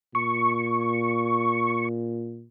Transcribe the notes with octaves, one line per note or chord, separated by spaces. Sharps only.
A#2 C#6